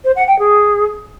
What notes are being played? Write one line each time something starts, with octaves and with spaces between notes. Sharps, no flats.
C5
F#5
G5
G#4